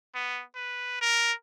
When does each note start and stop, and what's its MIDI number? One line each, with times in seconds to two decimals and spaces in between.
0.15 0.43 59
0.56 0.99 71
1.01 1.33 70